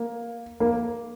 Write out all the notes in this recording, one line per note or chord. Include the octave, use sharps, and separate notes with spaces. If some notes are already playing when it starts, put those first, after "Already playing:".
Already playing: A#3
A#3